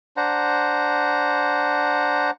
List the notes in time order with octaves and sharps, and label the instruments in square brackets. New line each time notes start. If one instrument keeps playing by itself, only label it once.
[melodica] D4 C5 F#5 A#5